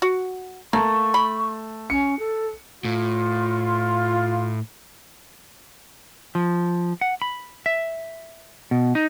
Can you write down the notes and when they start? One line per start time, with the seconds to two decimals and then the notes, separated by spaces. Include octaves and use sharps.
0.02 F#4
0.73 A3 A#3 A5 C#6
1.14 B5
1.90 C#4 C#7
2.19 A4
2.85 A2 F4
6.35 F3
7.01 F#5
7.22 B5
7.66 E5
8.71 B2
8.95 D#4